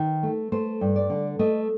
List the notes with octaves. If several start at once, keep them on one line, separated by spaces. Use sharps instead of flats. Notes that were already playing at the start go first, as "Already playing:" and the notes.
Already playing: D#3
A3
A3 C5
G2
D5
D3
A3 D#5